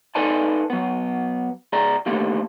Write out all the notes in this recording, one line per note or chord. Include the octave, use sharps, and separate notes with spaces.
D#4 A4 B4 D5 G#5 A5
F#3 B3
C#2 G#4 D5 A#5
D3 D#3 A3 A#3 G4